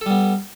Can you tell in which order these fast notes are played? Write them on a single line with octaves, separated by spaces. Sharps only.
A4 G3 B3